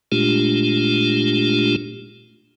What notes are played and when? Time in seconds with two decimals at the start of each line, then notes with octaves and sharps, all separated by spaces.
0.12 A#2 G#3 A3 D4 F4 G4